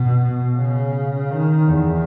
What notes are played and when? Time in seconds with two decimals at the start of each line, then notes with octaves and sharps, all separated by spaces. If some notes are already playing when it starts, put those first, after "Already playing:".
Already playing: B2
0.56 C#3
1.31 D#3
1.68 E2